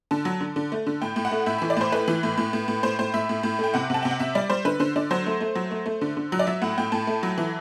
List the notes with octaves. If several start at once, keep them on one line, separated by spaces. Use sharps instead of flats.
D3 A5
F#3
D3
D3
A3
D3
A2 G5
A2
F#5
A3
A2 E5
E3 E5
D5
A2 C5
A3 B4
E3
A2
A2
A2
A2
A2 C5
A2 C5
A2 E5
A2
A2
A3 G5
C3 F#5
C3 A5
C3 G5
F#5
C3 E5
G3 D5
G3 C5
D3 B4
D3 C5
D3 D5
F#3 C5
A3
A3
F#3
A3
A3
D3
D3
F#3
D5
F#3 E5
A2 F#5
A2 G5
A2 A5
A3
F#3
E3